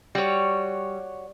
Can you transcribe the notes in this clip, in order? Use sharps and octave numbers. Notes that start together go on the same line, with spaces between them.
G3 F#4 C#5